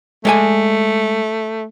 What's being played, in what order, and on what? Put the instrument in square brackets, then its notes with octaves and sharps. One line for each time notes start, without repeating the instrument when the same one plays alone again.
[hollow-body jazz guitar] G#3 D5 G#5 [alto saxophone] A3